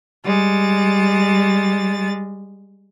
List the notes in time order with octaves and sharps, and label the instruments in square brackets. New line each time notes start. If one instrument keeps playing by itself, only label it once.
[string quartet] G3 G#3 A6